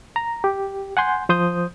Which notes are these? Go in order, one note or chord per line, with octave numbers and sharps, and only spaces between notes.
A#5
G4
F#5 G#5 C6 G6
F3 C5 D#6 G6